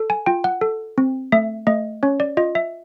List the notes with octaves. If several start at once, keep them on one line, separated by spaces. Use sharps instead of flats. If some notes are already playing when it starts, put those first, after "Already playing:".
Already playing: A4
G#5
F4 G5
F#5
A4
C4
A3 E5
A3 D#5
C#4 C#5
D5
F4 D#5
E5